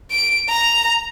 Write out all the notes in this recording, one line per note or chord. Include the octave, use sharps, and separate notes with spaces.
D7
A#5